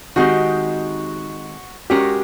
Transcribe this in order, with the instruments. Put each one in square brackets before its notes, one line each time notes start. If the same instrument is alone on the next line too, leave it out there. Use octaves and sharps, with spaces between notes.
[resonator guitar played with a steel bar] D#3 G#3 C4 D#4 G4 [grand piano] F#4
[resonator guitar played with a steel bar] G#3 C#4 F#4 A#4 [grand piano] G4